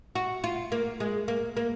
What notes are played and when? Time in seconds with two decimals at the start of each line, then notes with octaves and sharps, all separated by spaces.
0.15 F#4
0.44 F4
0.72 A#3
1.00 G#3
1.28 A#3
1.57 A#3